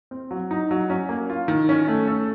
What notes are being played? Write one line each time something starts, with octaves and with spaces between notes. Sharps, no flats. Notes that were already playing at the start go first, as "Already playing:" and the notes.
C4
F#3
D#4
F#3
C#4
A#3
F4
D#3
C#4
A3
A4